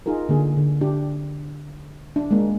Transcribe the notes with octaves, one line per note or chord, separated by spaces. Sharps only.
D#4 F4 G#4 A#4
D3 A#3 G#4
D3
D4 G4
D4
G#3 A#3